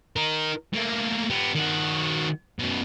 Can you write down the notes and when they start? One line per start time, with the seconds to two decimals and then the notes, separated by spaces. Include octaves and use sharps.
0.16 D#4 A#4
0.73 A3 A#3
1.30 B3 G4
1.55 D#3 F#4
2.59 F#2 B2